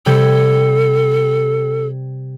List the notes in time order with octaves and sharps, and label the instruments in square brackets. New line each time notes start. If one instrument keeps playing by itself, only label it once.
[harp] C3 G3 G#6 [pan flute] A4